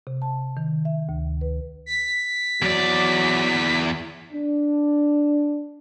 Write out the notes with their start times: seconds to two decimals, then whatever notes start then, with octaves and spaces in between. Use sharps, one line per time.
0.07 C3
0.22 A5
0.57 D#3
0.85 E5
1.09 D2
1.41 B4
1.86 B6
2.62 E2 F#3 D5
4.32 D4